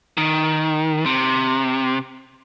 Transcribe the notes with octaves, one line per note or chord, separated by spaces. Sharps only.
D#3
C3